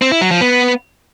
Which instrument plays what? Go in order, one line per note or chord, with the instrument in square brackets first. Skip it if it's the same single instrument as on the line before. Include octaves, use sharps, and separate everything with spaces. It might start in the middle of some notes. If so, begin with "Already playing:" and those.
[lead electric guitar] C4
E4
F#3
F3
B3